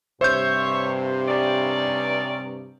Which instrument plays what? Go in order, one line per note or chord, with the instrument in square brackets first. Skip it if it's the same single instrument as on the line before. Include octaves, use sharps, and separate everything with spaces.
[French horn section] G2 C3 [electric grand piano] C5 G6 [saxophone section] C#5 E5
[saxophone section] C#4 D#4 D5